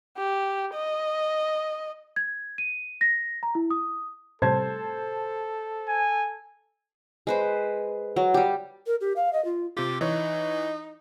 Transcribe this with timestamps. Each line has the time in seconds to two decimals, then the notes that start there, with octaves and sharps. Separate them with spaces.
0.18 G4
0.74 D#5
2.16 G#6
2.58 D#7
3.01 A#6
3.43 A#5
3.55 E4
3.70 D#6
4.42 A2 C3 G3 A4 C5 A5 G#6
5.89 G#5
7.27 G#3 B4 C5
8.16 F#3
8.34 G3 G4
8.87 A#4
9.01 G4
9.16 F5
9.33 D#5
9.45 F4
9.77 C3 F4 G4
10.01 E3 D#4 C#5